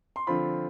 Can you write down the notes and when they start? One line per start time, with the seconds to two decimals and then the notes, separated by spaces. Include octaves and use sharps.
0.16 C6
0.27 D3 F3 C4 F4 B5